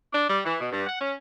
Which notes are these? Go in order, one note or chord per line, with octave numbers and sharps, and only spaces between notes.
D4
G3
E3
B2
G2
F#5
C#4